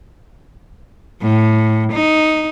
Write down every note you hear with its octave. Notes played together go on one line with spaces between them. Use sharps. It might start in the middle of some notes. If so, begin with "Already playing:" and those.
A2
D#4